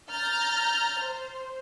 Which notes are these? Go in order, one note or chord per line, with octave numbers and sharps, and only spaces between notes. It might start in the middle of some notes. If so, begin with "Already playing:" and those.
A#5 F6 G6 A6
C5